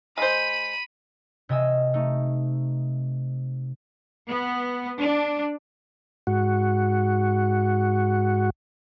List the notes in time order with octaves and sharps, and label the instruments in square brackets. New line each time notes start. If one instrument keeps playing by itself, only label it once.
[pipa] G#3 C5 [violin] B5 D#7
[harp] C3 D#5 G#5 E6
A3 D#4
[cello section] B3
D4
[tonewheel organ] G#2 F#4